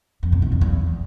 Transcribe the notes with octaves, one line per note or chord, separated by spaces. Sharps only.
F2
C3
D#3
F2
E2